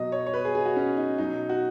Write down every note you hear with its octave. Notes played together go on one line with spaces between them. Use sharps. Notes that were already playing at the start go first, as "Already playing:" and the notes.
Already playing: B2 F#3 D#5
C#5
C#5
B4
G#4
G#4
F#4
C#4
D#4
B2 F#3 D#4
F#4